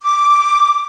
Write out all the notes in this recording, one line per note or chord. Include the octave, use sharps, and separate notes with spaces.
D6